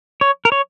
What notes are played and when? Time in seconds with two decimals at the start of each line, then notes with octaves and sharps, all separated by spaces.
0.21 C#5
0.45 A#4
0.52 C#5